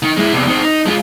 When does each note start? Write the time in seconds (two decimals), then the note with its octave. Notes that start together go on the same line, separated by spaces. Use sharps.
0.03 D#3
0.17 G#3 E4
0.33 E2 C3
0.47 D#3 C4
0.61 D#4
0.86 G#3 F4